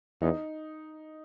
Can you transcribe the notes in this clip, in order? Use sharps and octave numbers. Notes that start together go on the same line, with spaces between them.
E2 D#4